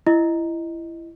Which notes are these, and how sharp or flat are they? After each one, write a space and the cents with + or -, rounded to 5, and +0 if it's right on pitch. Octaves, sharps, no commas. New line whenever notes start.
E4 +20 D#5 +0